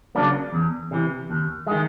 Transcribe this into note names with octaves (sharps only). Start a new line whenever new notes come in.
C#3 F#3 A#3 D4
E2
C3 E3
D#2
D#3 G#3